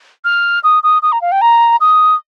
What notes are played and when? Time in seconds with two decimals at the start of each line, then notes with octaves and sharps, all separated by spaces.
0.25 F6
0.64 D#6
0.83 D#6
1.02 D#6
1.12 A#5
1.21 F5
1.32 G5
1.41 A#5
1.80 D#6